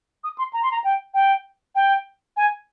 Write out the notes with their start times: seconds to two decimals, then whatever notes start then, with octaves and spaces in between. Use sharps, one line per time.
0.24 D#6
0.38 C6
0.53 A#5
0.63 C6
0.72 A#5
0.84 G5
1.14 G5
1.75 G5
2.37 G#5